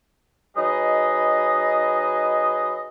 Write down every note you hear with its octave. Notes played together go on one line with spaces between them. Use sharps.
F#3 D#4 G#4 B4 D#5